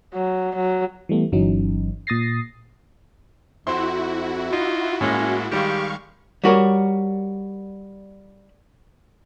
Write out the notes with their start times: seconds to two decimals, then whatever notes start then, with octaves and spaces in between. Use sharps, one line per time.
0.14 F#3
0.56 F#3
1.09 E3 G3 A3 B3
1.32 G1 E3 F#3 C#4 D#4
2.07 A#2 D#6 A6 A#6 C7
3.67 F2 C4 E4 F#4 C6
4.52 D#4 F4
5.01 A2 G#3 A#3 C#4
5.51 D#3 G3 G#3 G4 F5 C#6
6.44 G3 F#4 A#4 C#5